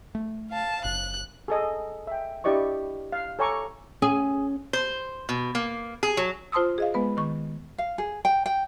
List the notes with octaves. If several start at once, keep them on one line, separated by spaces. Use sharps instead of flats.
A3
F5 A5
F#1 F#6
G#4 A4 D#5
E5 G5
D4 E4 G4 D5 D#5 C#6
F5
A4 C#5 G#5 A#5 C#6 D6
C#4 G#4
C5
B2
A#3
G#4
F#3
F4 C5 A5 C6 D#6 E6
G#4 D#5 F5
G#3 B3 B4
D#3 C#6
F5
G#4
G5
G5